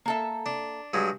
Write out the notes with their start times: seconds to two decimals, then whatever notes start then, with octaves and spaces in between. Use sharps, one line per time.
0.06 A#3 A4 E5
0.46 D4
0.93 G2 F#3 G#3